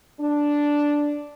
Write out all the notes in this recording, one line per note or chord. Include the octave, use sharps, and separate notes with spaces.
D4